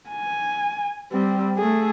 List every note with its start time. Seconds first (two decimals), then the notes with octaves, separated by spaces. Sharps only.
0.10 G#5
1.12 G3 C4
1.57 A3 G#4